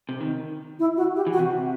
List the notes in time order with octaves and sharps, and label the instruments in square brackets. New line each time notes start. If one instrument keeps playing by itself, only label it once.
[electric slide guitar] C3
D#3
[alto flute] E4
F#4
G4
[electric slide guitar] E3
[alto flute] F#4
[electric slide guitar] C3